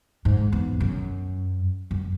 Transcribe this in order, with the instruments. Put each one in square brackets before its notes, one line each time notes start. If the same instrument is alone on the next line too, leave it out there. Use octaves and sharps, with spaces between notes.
[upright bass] G#2
E2
F#2
F#2